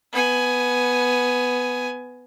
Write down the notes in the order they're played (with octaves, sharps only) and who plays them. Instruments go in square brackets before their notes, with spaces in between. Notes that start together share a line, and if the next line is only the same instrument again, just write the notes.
[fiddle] B3 G#5